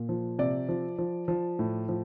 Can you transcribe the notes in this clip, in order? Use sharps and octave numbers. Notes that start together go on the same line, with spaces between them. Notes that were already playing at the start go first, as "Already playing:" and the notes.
Already playing: A#2
F3
C3 D5
F3
F3
F3
A2
F3